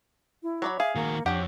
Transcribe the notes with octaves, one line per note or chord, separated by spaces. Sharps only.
E4
F#3 C#5 D5 B5
G#4 E5 F5
D#3 A#3 F#4
F2 D4 G4 C#5 F#5